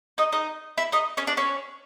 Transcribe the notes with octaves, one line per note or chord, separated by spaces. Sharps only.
D#4 D#5
D#4 D#5
E4 E5
D#4 D#5
C#4 C#5
D4 D5
C#4 C#5